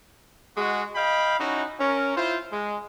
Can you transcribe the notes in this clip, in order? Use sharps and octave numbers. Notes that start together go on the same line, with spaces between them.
G#3 F#4
D#5 F5 G5 B5
C#4 D#4 E4 F#4
C#4 A#4
E4 F4 C5
G#3